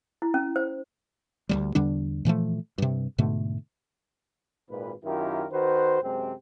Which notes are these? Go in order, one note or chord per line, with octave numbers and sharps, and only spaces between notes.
E4
C#4
C5
D2 F#3 G3
E2 D3 G3 D4
A#2 E3 F3 A3
G2 C3
G#2 B2 D3 A3
G#1 A#2 B4
F#2 D#3 E4 F4 G4 A#4
D#3 F#4 B4 C5
F#2 C3 G#3 C4